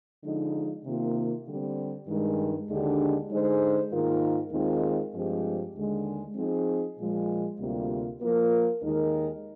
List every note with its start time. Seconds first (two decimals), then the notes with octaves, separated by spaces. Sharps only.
0.23 D3 F3 G#3 D#4
0.84 C3 D#3 A#3 F4
1.46 D3 G3 C4
2.07 G2 D#3 G#3
2.69 D#2 D3 G#3 D4 G4
3.30 D3 G#3 D#4 G#4 C5
3.91 G#2 D#3 A#3 F4 A#4
4.52 D#2 D#3 G#3 C4 F4
5.13 G2 F3 G#3 C4 G4
5.74 D#2 D3 G#3
6.36 F3 C4 D#4 G#4
6.98 A#2 F3 G#3
7.59 D2 C3 G3 A#3 F4
8.20 F3 A#3 F4 A#4
8.81 D#2 D#3 G#3 D#4 A#4